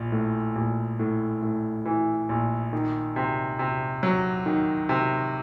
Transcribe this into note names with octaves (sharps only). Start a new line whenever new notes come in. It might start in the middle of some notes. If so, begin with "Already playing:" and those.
Already playing: A#1
A2
A#1
A2
A2
E3
A#1
D#3
C3
C3
F#3
D#3
C3